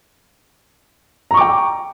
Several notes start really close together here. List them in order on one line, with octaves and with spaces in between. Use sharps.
A#5 C#6 D6 G5